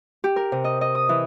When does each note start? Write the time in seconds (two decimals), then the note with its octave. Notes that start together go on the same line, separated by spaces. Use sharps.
0.24 G4
0.36 A#4
0.52 C3
0.64 D#5
0.81 D#5
0.95 D#6
1.09 E3